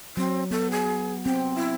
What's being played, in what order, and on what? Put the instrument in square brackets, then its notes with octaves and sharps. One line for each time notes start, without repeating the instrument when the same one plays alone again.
[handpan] F#3 [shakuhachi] C4
[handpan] B3 [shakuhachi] A4
[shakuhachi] G#4
[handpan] C4 [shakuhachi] G5
[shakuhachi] E4